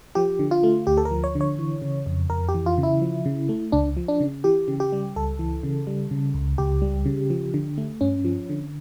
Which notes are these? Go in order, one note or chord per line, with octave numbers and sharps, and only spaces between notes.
F3 G4
D3
F4
A3
D2 G4
A4
A#4
F3
C#5
D3
C#5
E3
C#3
F2
F2 A#4
G4
E3
F4
C#3
E4
F3
C#3
A3
C#2 D4
F3
D4
C#3
E3 G4
C#3
G4
G3
C#2 A4
E3
C#3
G3
C#3
C#2
C#2 G4
G3
C#3
F3
D3
A3
G2 C#4
F3
D3